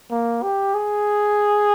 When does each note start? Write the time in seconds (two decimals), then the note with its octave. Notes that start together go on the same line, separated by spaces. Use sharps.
0.11 A#3
0.43 G4
0.74 G#4